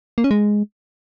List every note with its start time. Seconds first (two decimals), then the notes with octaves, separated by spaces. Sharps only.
0.18 A#3
0.24 C#4
0.31 G#3